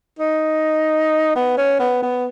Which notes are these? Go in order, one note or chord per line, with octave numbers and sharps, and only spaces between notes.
D#4
B3
C#4
B3
B3